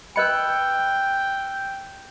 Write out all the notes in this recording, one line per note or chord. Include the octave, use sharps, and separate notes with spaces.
B4 D#5 G5 B5 E6 F#6 C#7